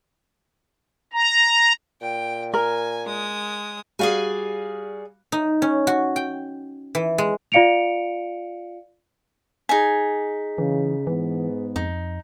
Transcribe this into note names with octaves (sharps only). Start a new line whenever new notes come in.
A#5
A#2 G5
A#4 G#5
G#3 D#6
G3 F#4 G#4 D5 F5 G#5
D#4
C#4
F#4
G5
E3
G#3
F4 D5 F5 C#7 D7 F7
D#4 G#4 G#5 B6
C#3 E3
G#2 E3 B3
F2 D#4